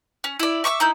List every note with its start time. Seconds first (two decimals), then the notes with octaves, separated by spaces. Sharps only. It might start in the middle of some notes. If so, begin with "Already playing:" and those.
0.24 C#4
0.40 E4 D5
0.64 E5 C#6 D6 E6
0.80 D#4 E4 G6